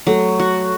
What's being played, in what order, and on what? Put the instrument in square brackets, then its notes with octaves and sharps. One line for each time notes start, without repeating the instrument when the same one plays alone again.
[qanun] F#3 [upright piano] A3
[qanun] F#4